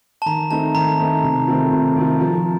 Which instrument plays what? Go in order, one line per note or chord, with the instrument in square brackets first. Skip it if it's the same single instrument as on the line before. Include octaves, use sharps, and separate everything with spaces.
[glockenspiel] A5
[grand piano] D#3 [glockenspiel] A#5
[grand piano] A3 C4 D#4 [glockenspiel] A5
[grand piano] D#3 [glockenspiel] A#5
[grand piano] A3 C4 D#4
C3
D#3 A3 C4 F4
C3
D#3 A3 C4 F4
F3